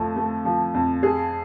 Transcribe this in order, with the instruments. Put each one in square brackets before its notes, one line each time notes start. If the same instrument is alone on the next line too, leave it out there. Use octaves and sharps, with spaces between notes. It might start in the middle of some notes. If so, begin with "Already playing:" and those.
Already playing: [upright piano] F2 F3 A3
A3
F3
F2
G#4